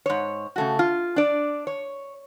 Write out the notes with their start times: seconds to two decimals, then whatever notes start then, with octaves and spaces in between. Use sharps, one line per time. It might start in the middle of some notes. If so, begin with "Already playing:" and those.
0.06 G#2 C#5
0.56 C#3 A3 F#4
0.79 F4
1.16 D4 D5
1.67 C#5